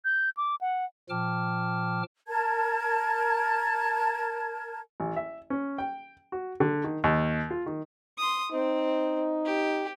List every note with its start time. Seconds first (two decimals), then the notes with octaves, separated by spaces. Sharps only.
0.05 G6
0.37 D6
0.61 F#5
1.10 A#2 F3 G5 A5 D6 F6
2.27 A#4 A5 G#6
5.00 A1
5.16 E5
5.50 C#4
5.78 G5
6.32 F#4
6.60 D3
6.84 D#3
7.04 D#2
7.50 F4
7.66 D#3
8.18 C6 D#6
8.52 C4 D#4
9.45 G4